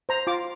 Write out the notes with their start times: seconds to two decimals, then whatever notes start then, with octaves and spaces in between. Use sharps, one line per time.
0.09 C5 A#5
0.27 F4 D6